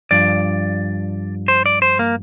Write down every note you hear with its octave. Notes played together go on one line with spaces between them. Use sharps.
G2 F3 D5
C5
D5
C5
A#3